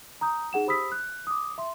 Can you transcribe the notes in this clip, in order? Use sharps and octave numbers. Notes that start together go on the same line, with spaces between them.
A#5 D#6 G6
D#4 G#4 F#5 E7
G4 C5 B5 D#6 E6 B6
F#6
D6 D#6
E5 C6